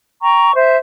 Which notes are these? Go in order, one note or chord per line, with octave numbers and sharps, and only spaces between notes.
G5 A#5 C#6
C5 E5